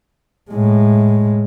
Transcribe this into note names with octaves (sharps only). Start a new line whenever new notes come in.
A2 G#3